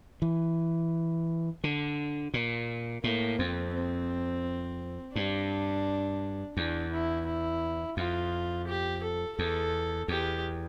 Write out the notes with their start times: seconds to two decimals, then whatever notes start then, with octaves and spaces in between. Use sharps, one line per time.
0.22 E3
1.64 D3
2.34 A#2
3.04 A2 A#3
3.39 F2 C4
3.74 C4
5.15 G2 D4
6.56 E2 D4
6.92 E4
7.26 E4
7.97 F2 F4
8.67 G4
9.03 A4
9.38 E2 A4
10.08 E2 G4